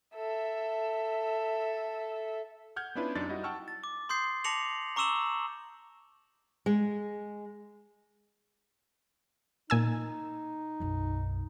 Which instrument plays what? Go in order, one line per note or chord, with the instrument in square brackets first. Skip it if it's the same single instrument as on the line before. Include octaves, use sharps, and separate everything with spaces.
[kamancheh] A4 E5
[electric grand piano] F#5 F6 G6 G#6
B3 C#4 D4 E4 F4 B4
F#2 D4 D#4 A6
G3 D#4 E4 F#4 D#5
F#5 G5 A5 C#6 E6 F6
[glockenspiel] A6
D6
C6 D#6 G6 C7
A5 D6 A#6 C#7 F7 F#7
A#5 C#6 D6 E6 E7 F#7
[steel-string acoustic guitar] G#3
[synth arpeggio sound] A#2 G#5 E6 [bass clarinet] D#4
[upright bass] B1 F#2